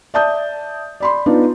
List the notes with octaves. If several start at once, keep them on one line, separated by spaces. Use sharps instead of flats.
D5 E5 A5 D#6 G6
D5 B5 C6
B3 D4 D#4 F4 D5